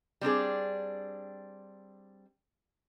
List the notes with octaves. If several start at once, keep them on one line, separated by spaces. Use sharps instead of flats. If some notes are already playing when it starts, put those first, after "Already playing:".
G3 C4 D4 G#4